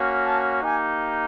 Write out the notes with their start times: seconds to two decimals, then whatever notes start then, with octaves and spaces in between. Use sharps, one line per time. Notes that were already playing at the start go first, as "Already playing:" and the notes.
Already playing: A#3 C#4 F#4
0.24 A5
0.62 A#3 D#4 G4 G#5